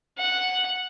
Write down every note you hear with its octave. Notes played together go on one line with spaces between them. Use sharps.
F#5